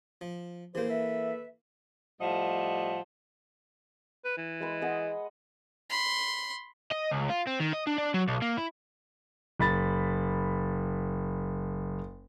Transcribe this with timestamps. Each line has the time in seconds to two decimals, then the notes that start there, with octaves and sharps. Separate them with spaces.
0.21 F3
0.75 E3 A#3 G4 G#4 C5
0.89 A4 B4 E5
2.20 A2 F3 G3 D#5 E5 F#5
4.25 B4
4.38 E3
4.60 G#3 B4 B5
4.82 G#4 D#5 F#5
5.90 B5 C6
6.92 D#5
7.12 C#2
7.30 F4
7.47 C4
7.60 D#3
7.73 D#5
7.87 D4
7.98 D4
8.14 F#3
8.28 B1
8.42 A#3
8.58 E4
9.60 F#1 B5 A6